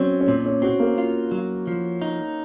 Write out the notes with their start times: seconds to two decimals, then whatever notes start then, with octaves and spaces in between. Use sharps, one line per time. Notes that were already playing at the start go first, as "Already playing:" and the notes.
Already playing: F#3 C4 C#4
0.20 C#4
0.28 A#2 C4
0.45 C#4
0.62 C4 F#4
0.80 A#3
0.98 F4
1.32 F#3
1.67 F3
2.02 D#4